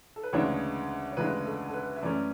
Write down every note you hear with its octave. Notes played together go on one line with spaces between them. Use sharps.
A4
B4
D2 C#3 E3 G#3 D4 C#5
C#5
D2 C#3 E3 G#3 D4 B4
A4
A4
B4
E5
F#2 E3 A3 C#4 D5